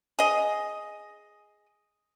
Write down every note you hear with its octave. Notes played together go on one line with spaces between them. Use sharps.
G#4 D#5